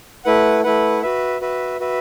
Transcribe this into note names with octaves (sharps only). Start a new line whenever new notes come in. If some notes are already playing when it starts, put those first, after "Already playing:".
A3 E4 B4 F#5
A3 E4 B4 F#5
F#4 B4 E5
F#4 B4 E5
F#4 B4 E5